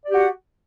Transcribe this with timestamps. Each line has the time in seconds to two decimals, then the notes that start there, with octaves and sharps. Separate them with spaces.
0.05 D5
0.09 G4
0.13 F#4
0.16 F#5